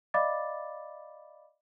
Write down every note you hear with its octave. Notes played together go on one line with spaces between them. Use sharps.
D5 D#5 F5 B5 D6 A6